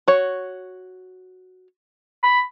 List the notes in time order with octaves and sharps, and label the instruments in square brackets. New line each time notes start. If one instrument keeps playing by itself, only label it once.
[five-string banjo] F#4 C#5
[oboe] B5